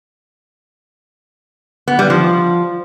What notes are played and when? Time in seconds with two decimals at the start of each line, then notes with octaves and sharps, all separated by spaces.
1.88 B3
1.99 G3
2.10 F3